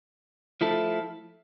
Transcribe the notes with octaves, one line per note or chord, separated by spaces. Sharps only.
F3 A3 E4 A4